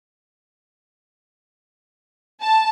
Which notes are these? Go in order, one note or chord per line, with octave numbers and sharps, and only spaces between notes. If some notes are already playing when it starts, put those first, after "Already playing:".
A5